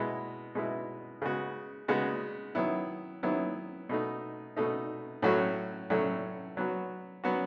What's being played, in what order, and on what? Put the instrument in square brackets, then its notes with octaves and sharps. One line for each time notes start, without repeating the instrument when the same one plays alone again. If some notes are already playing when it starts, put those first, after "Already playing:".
Already playing: [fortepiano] B2 G#3 B3 E4
B2 G#3 B3 E4
C#3 G#3 B3 F#4
C#3 G#3 B3 F#4
D#3 F#3 B3 E4
D#3 F#3 B3 E4
B2 A3 D#4
B2 A3 D#4
A2 F#3 A3 C#4 F#4
A2 F#3 A3 C#4 F#4
F#3 B3 F#4
F#3 B3 F#4